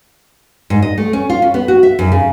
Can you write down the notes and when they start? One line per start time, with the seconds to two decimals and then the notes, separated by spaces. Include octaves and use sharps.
0.70 G#2
0.82 D#5
0.98 A3
1.13 C#4
1.30 F4
1.42 C#4
1.54 B3
1.68 F#4
1.83 E5
1.99 F#2
2.12 C#3